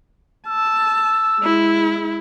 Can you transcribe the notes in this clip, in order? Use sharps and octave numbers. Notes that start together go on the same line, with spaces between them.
A5 E6
G#3 E4